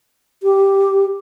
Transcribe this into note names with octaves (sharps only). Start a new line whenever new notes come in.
G4